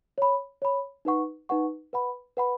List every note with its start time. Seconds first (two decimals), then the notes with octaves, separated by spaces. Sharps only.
0.18 C#5 B5
0.62 C#5 B5
1.05 D#4 B4 F#5 C#6
1.49 D#4 B4 F#5 C#6
1.93 B4 F#5 B5
2.37 B4 F#5 B5